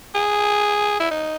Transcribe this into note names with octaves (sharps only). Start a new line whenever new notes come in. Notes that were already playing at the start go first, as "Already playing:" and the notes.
G#4
E4
D#4